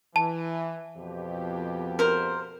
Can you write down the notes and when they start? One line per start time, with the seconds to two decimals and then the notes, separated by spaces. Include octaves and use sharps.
0.16 E3 A5
0.97 F2 B2 G4
1.99 A#4 C5